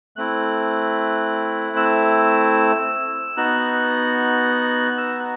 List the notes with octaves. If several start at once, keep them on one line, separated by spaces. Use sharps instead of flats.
A3 C4 E4 F#6
E6
B3 D#4 F#4 F#6
F#6
E6
F#6